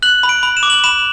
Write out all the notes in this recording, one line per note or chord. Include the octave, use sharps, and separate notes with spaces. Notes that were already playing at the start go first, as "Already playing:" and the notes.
F#6 F#7
B5
D7
B5
E7
D6
F#7
B5 E7